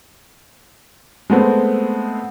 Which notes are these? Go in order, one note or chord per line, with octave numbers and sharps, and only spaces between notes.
G#3 A3 B3 C4